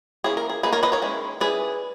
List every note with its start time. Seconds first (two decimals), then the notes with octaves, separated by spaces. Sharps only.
0.24 E3 A#3 C#4 E4 G#4
0.37 A#4
0.50 G#4
0.63 G3 A#3 D#4 G#4 B4
0.73 A#4 C#5
0.83 B4 D#5
0.92 A#4 C#5
1.02 D#3 G#3 C#4 E4
1.40 G3 C#4 E4 G#4 B4